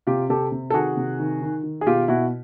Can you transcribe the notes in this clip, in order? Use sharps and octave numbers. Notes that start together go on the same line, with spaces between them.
C3 F4 G4
C3 G4 A4
C3
A4
D#3 F#4 G#4
C3
D#3
D#3
D#3
G#4
B2 F4 G4
B2 E4 F#4